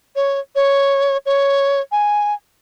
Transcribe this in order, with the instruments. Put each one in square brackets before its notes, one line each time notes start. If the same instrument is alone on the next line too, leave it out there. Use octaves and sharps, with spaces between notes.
[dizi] C#5
C#5
C#5
G#5